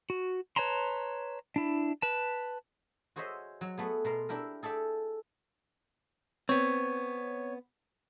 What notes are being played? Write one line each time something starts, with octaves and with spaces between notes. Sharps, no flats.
F#4
B4 C#5 A5 A#5 C6
D4 E4
B4 A5
F#4 G#4 C5 C#5 D#5 E5
F#3
A3 B3 G#4
B2 A#4 C6
D4 E4 G4 A#4
G#4 A4 D5 E5 G5
B3 C4 C#5